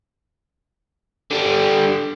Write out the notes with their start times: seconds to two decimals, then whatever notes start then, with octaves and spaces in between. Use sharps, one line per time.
1.31 D3 G3